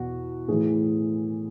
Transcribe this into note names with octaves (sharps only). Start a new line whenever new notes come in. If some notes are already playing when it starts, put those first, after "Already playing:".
Already playing: E2 B2 F#4
A2 E3 G#4